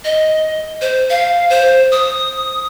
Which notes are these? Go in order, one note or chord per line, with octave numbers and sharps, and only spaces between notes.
D#5
C5
F5
C5
D#6